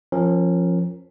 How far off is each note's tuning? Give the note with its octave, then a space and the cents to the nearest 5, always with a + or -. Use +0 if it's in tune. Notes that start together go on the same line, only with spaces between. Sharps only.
F3 +0 C#4 -35 A#4 +0